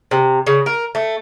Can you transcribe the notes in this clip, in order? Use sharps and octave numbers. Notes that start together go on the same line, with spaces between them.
C3
C#3
A#4
A3